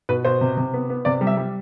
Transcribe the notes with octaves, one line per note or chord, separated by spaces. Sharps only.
B2 B4
B2 C5
C3
C3
B3
B3
C3 D5
G3
E5
G3